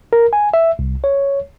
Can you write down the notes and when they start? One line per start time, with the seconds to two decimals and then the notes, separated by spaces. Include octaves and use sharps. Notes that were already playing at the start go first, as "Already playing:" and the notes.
0.13 A#4
0.33 G#5
0.54 E5
0.79 C2
1.04 C#5